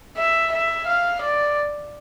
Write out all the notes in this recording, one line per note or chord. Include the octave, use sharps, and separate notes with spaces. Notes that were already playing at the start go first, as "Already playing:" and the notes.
E5
E5
F5
D5